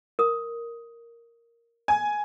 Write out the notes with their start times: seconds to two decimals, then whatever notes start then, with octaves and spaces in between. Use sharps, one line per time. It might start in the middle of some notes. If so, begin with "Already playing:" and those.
0.19 A#4 D#6
1.88 G#5